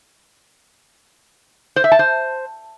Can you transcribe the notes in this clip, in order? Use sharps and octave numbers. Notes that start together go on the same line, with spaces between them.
C5
E5
A5
C5